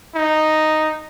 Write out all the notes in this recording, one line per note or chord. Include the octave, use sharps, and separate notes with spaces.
D#4